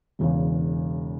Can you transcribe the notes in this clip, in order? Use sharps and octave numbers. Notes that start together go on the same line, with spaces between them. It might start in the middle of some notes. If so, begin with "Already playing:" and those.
E1 E2 C#3